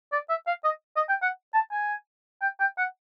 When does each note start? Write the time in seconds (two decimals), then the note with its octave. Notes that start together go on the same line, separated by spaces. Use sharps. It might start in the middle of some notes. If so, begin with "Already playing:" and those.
0.12 D5
0.29 E5
0.47 F5
0.64 D#5
0.96 D#5
1.09 G5
1.22 F#5
1.54 A5
1.72 G#5
2.42 G5
2.60 G5
2.78 F#5